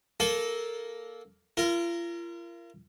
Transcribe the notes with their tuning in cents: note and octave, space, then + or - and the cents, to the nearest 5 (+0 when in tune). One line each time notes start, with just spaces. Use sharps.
A#3 +0 A4 -15
F4 -40 A#4 +0